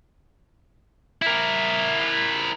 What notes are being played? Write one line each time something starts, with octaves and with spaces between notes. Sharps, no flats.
E4 A#4